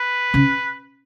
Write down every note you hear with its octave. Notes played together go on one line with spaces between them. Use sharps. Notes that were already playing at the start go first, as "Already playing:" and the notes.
Already playing: B4
C#3